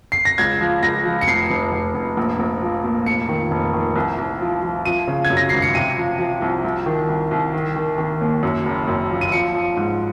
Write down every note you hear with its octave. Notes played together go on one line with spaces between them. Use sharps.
C7
A#6
C#2 G#6
F3
C#2 A#6
F3
C#7
F1 C7
F1
F1
F1
A#1
A#1
F3
A#2
F1 C#7
D#3
F1
D#3
C2
C2
F3
F3
F3 D#7
C#3
G#6
F#2
A#6
G#1 C7
C#7
C3 D#7
F3
F3
C2
C2
D#3
C2
C2
D#3
D#3
D#3
D#2
F#2
F#1
F#2
F3
D#7
F3 C#7
F3
G#2